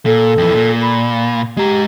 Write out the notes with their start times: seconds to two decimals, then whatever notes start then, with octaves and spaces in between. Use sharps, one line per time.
0.06 A#2 A4
0.38 F2 E3
0.54 A#2
0.82 B5
1.57 G#3 G4 A#5